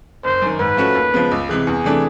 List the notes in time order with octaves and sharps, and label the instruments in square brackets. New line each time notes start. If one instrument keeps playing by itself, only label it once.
[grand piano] F#1 [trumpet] C5
[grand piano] F#2 D#3
[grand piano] G#2 [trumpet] B4
[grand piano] F3 A3 C#4 F#4
D#2
C#3 F3 G#3 B3
C#2
C3 E3 G#3
[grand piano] E2 [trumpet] G#4
[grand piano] C3 E3 A3 D4